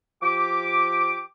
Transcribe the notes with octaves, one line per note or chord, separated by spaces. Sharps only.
F3 G4 D6